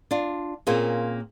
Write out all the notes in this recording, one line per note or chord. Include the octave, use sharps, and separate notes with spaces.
D4 F4
A#2 A#3 C4 C#4 F4 G#4